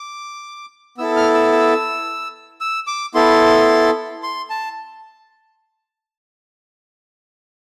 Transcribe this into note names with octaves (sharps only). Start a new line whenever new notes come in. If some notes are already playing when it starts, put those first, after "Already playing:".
Already playing: D6
B3 E4 A4 E6
F6
E6
E6
E6
D6
B3 E4 A4 C6
C6
A5